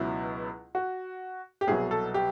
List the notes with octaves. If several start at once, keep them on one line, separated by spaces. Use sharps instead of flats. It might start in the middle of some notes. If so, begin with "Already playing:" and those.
Already playing: C#2 B2 F#3 E4
F#4
G4
C2 B2 F#3 G#4
A4
G4